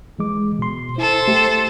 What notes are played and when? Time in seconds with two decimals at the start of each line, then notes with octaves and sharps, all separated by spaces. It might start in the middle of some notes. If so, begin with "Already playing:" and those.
0.19 E3 G#3 D6
0.59 B2 C6
0.98 E4 A4 C5
1.28 A3 G4